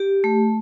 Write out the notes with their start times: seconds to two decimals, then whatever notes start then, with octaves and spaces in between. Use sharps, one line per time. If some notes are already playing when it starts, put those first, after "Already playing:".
Already playing: G4
0.24 A3